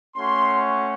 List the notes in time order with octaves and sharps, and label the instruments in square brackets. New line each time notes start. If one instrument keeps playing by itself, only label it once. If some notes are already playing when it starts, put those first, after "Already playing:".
[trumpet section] A3 C#4 F#4 C6